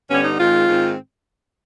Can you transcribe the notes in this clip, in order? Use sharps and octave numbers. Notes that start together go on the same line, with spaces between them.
G2 D3 G3 B3 C#4
D#4
G#2 D#3 G#3 C4 F4
G#2 D#3 G#3 C4